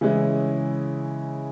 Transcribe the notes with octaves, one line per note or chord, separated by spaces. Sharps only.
C#3 E3 G#3 C#4 E4